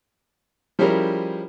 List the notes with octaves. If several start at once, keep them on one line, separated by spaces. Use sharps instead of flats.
F3 G3 C#4 E4 G#4 A#4